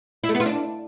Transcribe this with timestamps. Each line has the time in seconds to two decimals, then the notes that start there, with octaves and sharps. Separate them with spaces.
0.24 E4
0.29 A3
0.35 B3
0.40 F4
0.46 D4